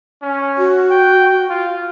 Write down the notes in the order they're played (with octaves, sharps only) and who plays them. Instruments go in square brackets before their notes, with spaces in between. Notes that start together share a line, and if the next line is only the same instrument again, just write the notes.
[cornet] C#4
[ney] F#4
[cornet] G5
F4